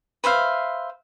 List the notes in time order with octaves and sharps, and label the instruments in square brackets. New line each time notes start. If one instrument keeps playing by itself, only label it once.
[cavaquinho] B4 C5 E5 F5